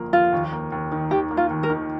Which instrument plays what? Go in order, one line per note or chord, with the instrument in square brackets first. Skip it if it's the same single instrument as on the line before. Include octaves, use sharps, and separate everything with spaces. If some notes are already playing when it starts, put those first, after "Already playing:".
Already playing: [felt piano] G1 F2 F3 A#3
[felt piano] F2 [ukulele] F4
[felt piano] D#2
A#3
D#2
D#3
[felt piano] D#2 [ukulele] G4
[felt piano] A#3
[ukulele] F4
[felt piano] D#2
[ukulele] A#4
[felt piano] D#3